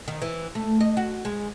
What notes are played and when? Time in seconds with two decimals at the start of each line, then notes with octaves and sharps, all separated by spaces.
0.08 D#3
0.22 E3
0.55 A3
0.80 D#5
0.97 F#4
1.25 G#3